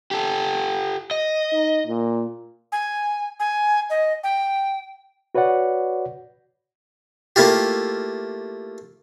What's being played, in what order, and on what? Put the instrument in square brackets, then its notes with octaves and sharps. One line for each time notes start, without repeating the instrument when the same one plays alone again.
[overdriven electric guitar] G4 A4
D#5
[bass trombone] D#4
A#2
[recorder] G#5
G#5
D#5
G5
[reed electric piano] F#4 B4 C#5 D5 F#5
[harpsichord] A3 A#3 E4 F4 G4